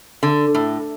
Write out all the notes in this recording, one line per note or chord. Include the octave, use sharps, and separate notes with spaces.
D3
A2